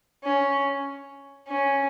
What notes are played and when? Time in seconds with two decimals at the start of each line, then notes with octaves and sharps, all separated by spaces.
0.24 C#4
1.47 C#4